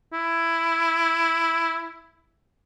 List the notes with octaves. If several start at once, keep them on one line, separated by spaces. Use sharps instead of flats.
E4